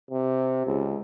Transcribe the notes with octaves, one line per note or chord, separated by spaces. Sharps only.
C3
C#2